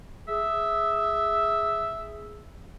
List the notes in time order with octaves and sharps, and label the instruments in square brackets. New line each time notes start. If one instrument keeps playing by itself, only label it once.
[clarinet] G#4 [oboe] E5